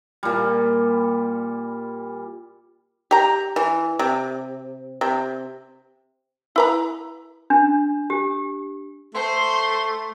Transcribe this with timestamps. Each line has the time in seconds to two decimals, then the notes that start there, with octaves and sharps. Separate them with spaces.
0.23 A#2 G3
3.11 G4 A#5
3.56 E3
3.99 C3
5.01 C3
6.56 E4 B4 A#5
7.50 D4
8.10 G4
9.14 A3 C5 C6